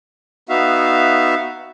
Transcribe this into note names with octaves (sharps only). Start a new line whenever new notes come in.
B3 D#4 F#4 E5 F5